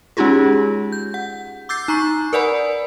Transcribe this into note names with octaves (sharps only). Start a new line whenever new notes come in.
G#3 C#4 D#4 F4 G4 G#4
G6
F#5
D6 E6 G6 A6 C7
D#4 A#5 C#6 C7
A#4 B4 D5 F#5 G#5 B5